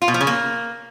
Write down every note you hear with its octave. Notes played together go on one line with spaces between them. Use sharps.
F4
B2
F3
C#3
A#3